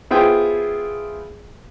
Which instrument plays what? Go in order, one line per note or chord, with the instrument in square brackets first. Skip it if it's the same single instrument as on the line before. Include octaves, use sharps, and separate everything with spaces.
[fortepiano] B3 E4 F4 G#4 C5 G5